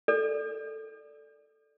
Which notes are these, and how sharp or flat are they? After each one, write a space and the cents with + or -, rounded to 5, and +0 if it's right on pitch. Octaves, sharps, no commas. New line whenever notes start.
A4 +0 D5 +0